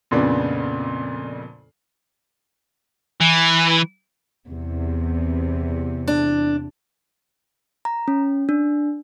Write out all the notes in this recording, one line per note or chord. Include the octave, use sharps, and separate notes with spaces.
F2 A#2 C#3 B3 D4
E3
E2 C3
D4
A#5
C#4
D4